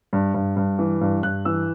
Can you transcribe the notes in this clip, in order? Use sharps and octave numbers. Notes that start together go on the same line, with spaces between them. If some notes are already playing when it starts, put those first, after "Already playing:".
G2
G2
G2
E3
G2
G2 F#6
E3 E6